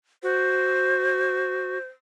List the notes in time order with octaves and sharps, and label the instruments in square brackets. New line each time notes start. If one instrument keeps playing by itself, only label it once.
[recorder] F#4 [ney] C5